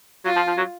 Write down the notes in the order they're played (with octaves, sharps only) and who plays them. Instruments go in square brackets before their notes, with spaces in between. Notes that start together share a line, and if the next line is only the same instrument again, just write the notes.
[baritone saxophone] F#3 [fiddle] F4
[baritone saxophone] F3
F3
F#3